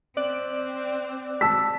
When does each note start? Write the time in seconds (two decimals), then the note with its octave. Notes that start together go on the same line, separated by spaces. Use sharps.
0.17 C4 D5 D6 F#6
1.41 A5 E6 B6